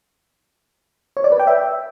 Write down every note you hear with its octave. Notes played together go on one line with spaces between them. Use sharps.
C#5
D5
B4
G5
E5